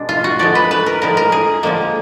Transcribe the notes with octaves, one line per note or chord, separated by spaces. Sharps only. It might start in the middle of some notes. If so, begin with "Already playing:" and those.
Already playing: B2 G#3 D4
F4
F#4
D3 F3 G#3 D5
B4
B4
A#4
D3 F3 G#3 A#4
A#4
G#4
D3 F3 G#3 A#3